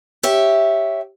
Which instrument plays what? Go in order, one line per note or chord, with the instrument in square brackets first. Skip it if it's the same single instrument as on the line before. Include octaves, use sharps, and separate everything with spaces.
[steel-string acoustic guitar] G4 C#5 E5